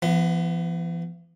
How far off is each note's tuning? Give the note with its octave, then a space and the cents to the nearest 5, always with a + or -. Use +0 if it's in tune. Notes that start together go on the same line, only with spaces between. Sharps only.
E3 +45 B3 +0